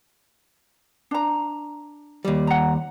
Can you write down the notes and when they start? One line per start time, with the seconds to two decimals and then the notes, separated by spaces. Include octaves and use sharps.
1.11 D4 A#5
2.25 D#2 G3
2.47 F#5 A#5